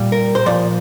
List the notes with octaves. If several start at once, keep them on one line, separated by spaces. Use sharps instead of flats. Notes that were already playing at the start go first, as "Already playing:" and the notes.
Already playing: A#2 G3
A#4
C5
A#2 F3 D5